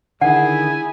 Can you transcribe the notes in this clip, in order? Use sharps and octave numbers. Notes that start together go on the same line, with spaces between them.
D3 D#3 E4 G#4 F#5 G#5